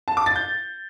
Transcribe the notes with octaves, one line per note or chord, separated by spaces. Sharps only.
A5
D6
A6
G6